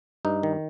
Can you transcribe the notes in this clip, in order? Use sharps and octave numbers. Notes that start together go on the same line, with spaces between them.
G2 D#4
D#3